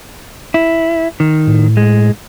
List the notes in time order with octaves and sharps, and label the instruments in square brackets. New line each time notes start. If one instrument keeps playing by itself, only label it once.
[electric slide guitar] E4
D#3
[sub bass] A2
[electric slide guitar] G#3